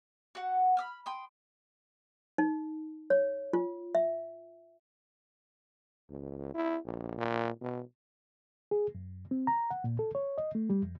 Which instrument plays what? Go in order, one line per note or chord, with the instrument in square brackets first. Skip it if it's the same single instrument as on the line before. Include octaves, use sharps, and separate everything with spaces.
[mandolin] F#4 F#5
B5 D#6 F6
G5 C6 D#6
[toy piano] D#4
C#5
F4
E5
[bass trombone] C#2
E4
A#1
A#2
B2
[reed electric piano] G#4
F#2
C4
A#5
F#5
A#2
A4
C#5
D#5
A3
G3
F2